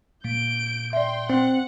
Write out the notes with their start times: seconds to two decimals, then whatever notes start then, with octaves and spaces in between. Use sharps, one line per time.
0.24 A#2 G6 D7
0.93 D5 E5 G5 C6
1.30 C4 F#5